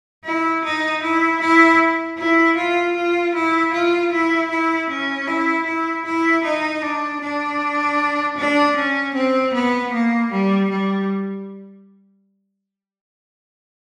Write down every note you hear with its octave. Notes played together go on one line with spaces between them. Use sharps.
E4
D#4
E4
E4
E4
F4
F4
E4
F4
E4
E4
C#4
E4
E4
E4
D#4
D4
D4
D4
C#4
C4
B3
A#3
G3
G3